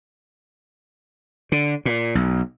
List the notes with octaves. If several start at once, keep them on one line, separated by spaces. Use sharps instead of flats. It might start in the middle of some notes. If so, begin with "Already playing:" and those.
D3
A#2
B1